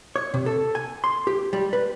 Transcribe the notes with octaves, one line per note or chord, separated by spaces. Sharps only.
C#5
C3
A4
G#5
C6
G4
G3
B4